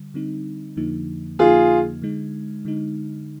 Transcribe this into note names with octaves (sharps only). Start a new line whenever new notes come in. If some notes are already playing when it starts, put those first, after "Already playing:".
Already playing: D3 G3
D3 G3 C4 D#4
F2 D3 F3 A#3 D#4
F2 D3 F3 A#3 D#4 F4 G#4
D3 G#3 D#4
D3 G#3 D#4